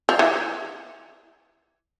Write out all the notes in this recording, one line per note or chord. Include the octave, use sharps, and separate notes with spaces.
F3
E3